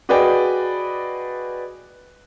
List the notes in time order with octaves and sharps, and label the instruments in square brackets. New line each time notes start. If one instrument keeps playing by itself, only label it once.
[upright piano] F#4 G#4 B4 D5 D#5 G5